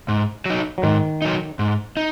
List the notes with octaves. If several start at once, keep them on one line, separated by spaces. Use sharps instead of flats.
G#2
F#3 D#4
F#3
G#2 D#3
F#3 D#4
G#2
D#4